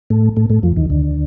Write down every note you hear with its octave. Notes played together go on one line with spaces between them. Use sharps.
A2 A3
A2 A3
A2 A3
F2 F3
D#2 D#3
D2 D3